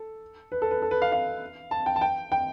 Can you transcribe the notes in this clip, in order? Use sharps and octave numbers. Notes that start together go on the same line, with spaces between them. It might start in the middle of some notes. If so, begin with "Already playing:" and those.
Already playing: A4
B4
A4
B4
A4
B4
F5
F5
A5
G5
A5
G5
G5